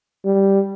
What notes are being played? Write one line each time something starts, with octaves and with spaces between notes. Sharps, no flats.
G3